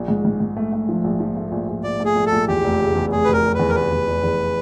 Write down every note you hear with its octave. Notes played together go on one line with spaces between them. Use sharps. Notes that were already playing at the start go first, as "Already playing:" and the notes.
Already playing: A#1
G#2
G#2
G#2
A3
A3
F3
A#1
F3
A3
A#1
A#1
A#1 D5
A3
G#4
A#1
A4
A#1
E2 G4
F1
C#3
E2
F1 G#4
B4
F1
A#4
F1
E2 B4
A#4
F1 B4
E2
F1
E2